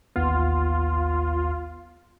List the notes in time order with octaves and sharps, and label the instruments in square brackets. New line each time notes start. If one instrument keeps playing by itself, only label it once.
[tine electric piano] A1 D#2 B3 [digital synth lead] F4